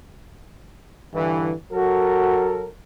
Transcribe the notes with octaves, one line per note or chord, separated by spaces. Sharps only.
G2 D3 E3
F#3 F#4 A4 A#4